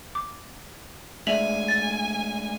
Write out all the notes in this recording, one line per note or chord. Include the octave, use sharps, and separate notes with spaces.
D6
G#3 A3 D4 E5 G#5 F7 F#7
A6